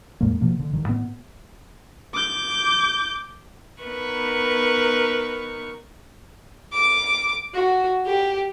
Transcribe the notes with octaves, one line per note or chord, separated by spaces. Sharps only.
E2 A2 G#3 A#3
B2 F3 A#3
D3
G2 D#3
A2 B3
D6 G6
B3 D#4 A#4 B4 C#6
D6
F#4
G4